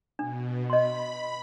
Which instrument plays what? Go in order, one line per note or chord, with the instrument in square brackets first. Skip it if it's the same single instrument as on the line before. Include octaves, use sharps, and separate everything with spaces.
[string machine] B2 [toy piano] D4
[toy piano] D#5 C6 [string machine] B5